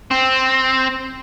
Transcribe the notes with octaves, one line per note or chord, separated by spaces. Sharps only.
C4